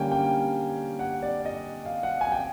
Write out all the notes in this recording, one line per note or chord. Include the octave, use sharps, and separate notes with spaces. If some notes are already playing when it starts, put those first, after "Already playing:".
Already playing: D3 G3 A#3 C#4 G5 G#5
G5
F#5
D5
D#5
F5
F#5
G#5
G5